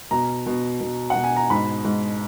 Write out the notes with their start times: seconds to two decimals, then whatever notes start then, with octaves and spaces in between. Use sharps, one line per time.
0.11 B2 A#5
0.46 B2
0.81 B2
1.10 F#5
1.15 B2
1.24 G#5
1.37 A#5
1.50 G#2 B5
1.85 G#2